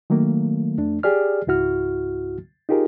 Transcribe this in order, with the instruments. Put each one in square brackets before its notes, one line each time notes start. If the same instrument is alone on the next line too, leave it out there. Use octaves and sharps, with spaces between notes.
[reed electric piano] D#3 F#3 A3 A#3
F2 A3 D4
G4 G#4 D5 F6
C#2 G#2 E4 F#4 F6
D#4 F4 G4 G#4 A#4